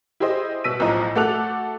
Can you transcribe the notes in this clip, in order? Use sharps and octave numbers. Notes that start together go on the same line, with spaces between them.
E4 G4 G#4 C5 D#5
B2 E6 B6 D#7
B1 A2 F3 D#5 A#5
A3 F#4 A4 D6 F#6 F7